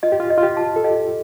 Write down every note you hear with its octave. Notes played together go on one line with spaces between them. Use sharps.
F4 D#5
G4
F4
D#5
F4
G4
A5
A4
G4 D#5